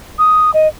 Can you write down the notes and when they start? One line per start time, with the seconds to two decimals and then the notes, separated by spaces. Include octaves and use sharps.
0.18 D#6
0.54 D#5